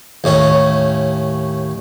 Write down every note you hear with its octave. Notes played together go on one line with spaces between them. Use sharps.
D#2 A2 C#4